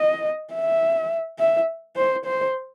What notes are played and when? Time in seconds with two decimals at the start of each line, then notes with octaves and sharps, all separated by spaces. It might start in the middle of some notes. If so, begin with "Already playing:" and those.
Already playing: D#5
0.54 E5
1.39 E5
1.96 C5
2.25 C5